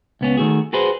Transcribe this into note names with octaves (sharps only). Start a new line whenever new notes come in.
C#2 B3 C#4
D#3 A3 F#4 G#4
F#4 G#4 B4 C5